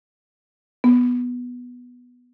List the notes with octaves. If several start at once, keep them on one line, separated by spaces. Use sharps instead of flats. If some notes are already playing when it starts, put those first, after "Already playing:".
B3